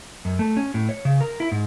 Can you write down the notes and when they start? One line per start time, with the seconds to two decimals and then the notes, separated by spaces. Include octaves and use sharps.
0.25 F#2
0.39 A3
0.57 C#4
0.74 A2
0.89 C#5
1.05 C#3
1.21 A#4
1.40 E4
1.52 G#2